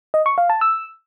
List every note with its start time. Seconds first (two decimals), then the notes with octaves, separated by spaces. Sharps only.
0.14 D#5
0.26 C#6
0.38 F5
0.50 A5
0.61 E6